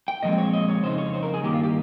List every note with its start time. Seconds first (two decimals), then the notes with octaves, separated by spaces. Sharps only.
0.08 G5
0.23 A#2 F3 G#3 C4 D#5
0.38 C#5
0.53 D#5
0.68 C#5
0.82 F2 C#3 D#4 C5
0.98 C#5
1.14 C5
1.23 A#4
1.34 G#4
1.43 G2 D#3 A#3 G4
1.53 F4
1.63 G4